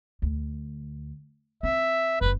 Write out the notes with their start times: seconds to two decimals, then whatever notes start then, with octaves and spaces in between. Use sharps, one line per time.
0.22 D2
1.63 C4 E5
2.21 F#1 F#2 B4